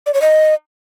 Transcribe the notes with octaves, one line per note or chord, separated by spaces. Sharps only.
D5
C#5
D#5